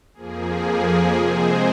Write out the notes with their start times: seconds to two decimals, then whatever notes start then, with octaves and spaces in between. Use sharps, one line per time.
0.14 F2 F3 A#3 G#4
1.16 C3 G#3 C4 G#4 C5